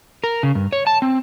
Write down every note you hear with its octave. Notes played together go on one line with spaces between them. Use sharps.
A#4
C#3
G2
C#5
A5
C4